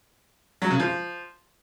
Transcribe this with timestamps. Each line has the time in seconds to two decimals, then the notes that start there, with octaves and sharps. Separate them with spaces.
0.62 F#3
0.71 C#3
0.79 F3